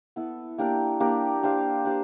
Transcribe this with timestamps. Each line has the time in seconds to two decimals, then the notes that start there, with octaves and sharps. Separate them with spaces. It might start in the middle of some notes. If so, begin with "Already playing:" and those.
0.16 B3 E4 A4
0.58 A#3 D4 G4 A#4
1.00 A#3 D4 G4 A#4
1.43 D4 G4 C5 F5
1.85 D4 G4 C5 F5